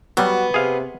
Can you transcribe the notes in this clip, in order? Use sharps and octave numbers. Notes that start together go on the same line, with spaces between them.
F#3 G3 B3 F#4
C3 G#4 F5